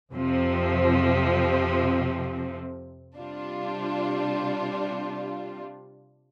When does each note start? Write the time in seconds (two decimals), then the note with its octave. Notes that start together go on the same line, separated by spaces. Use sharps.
0.12 F2 C3 F3 C4
3.17 C3 G3 D4 F4